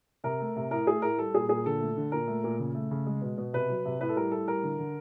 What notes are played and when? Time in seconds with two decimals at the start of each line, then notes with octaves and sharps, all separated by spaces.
0.24 C3 A#4
0.40 A3
0.56 C3
0.71 A2 A#4
0.87 A3 G#4
1.02 A2 A#4
1.18 G3 A4
1.34 A#2 G#4
1.49 A#2 G#4
1.66 D3 A4
1.81 A3
1.97 D3
2.12 A#2 A#4
2.27 A3
2.44 A#2
2.59 C#3
2.75 A3
2.91 C#3
3.06 G#3
3.22 B2
3.38 B2
3.53 C3 B4
3.70 F#3
3.85 C3
4.00 A2 B4
4.09 A4
4.16 G3 A#4
4.31 A2 A4
4.48 G3 A#4
4.63 D3
4.79 D3